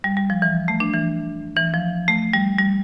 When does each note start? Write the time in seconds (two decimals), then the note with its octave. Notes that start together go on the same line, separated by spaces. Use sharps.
0.04 G3
0.17 G3
0.30 F3
0.42 E3
0.68 A3
0.80 D4
0.93 E3
1.56 E3
1.74 F3
2.08 A3
2.33 G3
2.59 G3